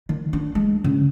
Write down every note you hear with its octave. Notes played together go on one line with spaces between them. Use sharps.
D#3
D4
G#3
C#3